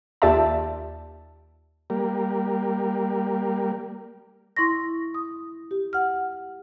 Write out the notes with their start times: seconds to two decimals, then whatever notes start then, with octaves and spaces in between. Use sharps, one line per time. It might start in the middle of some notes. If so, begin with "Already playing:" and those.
0.22 D#2 F4 G4 D5 E5 A5
1.90 G3 A#3
4.56 E4 C6 C#6 A#6
5.14 D#6
5.71 G4
5.93 F#5 F6